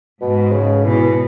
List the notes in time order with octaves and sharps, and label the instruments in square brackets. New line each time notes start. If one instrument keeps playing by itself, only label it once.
[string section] G#2 [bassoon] B2
[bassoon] C#3
[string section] B2 [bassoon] E3